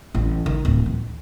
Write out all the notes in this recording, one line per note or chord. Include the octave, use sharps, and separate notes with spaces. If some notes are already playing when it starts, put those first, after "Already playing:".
A1
D#3
D1
D#3